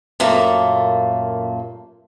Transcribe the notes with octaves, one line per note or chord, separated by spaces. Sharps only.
F#2 A#2 A3 A#3